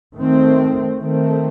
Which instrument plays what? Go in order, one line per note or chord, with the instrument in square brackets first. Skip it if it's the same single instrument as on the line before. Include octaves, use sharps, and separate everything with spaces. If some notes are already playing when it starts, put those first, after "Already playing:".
[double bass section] D#3 A3 C4
D#3 A3 C4